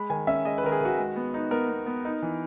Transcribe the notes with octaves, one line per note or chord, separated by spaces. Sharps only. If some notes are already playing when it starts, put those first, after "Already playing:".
Already playing: G#3 B5
D#3 G#5
C#4 E5
G#3 D#5
B4
D#3 A#4
G#4
D#3 F#4
G#3
B3
D#4
B3 A#4
B3
B3
D#4
E3